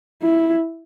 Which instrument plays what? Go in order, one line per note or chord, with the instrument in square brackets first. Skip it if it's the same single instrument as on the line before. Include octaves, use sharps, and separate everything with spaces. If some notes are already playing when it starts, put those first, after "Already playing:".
[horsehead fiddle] E4